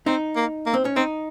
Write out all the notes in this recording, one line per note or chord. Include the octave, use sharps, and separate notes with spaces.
C4 D#4
A#3
A#3
C4
C#4
C4 D#4